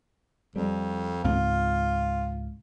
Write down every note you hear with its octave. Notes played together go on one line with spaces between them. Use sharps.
F2 G3
C#2 G#2 C4 F4